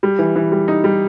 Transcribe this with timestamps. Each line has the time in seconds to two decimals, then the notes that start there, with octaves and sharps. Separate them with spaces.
0.03 G3
0.19 E3
0.36 E3
0.52 G3
0.68 D#4
0.84 G3